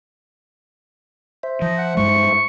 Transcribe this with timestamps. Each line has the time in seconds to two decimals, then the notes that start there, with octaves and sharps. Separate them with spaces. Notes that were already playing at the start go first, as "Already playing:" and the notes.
1.43 C5 E5
1.62 F3 D#4
1.78 F#5
1.97 G2 G#3 C#6